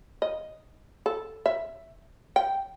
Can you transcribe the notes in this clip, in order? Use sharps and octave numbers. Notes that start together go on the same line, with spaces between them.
D#5
A4
E5
G5